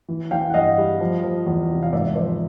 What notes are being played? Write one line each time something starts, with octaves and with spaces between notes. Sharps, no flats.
E3
E3 F5 G5
F#5
G2 D#5 F5
G3
F3
F3
E2
C3
F5
G#2 D5 E5
F3 C5 D5